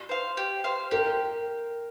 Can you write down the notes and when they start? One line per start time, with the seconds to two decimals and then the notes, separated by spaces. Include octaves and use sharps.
0.09 C5 F5
0.37 G4
0.64 C5 F5
0.91 G4 A#4